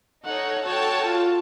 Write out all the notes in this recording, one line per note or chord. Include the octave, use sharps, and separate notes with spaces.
D#4 A4 C#5 F#5
F#4 A4 C#5 G5 A5
F4